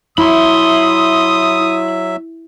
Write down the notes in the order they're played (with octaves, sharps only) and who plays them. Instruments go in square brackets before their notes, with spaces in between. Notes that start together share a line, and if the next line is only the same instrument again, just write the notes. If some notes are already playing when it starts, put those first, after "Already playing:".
[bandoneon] F#3 E5 [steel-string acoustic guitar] E4 [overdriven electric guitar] B5 C6 [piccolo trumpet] D#6